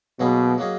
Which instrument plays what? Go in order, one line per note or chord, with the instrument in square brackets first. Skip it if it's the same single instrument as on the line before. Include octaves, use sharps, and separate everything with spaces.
[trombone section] B2 [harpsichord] F#3 A#3 C#4 G#4 D#5
[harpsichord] F#3 A#3 C#4 G#4 D#5